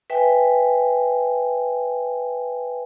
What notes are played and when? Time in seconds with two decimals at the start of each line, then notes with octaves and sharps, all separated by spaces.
0.10 B4 E5 G5 G#5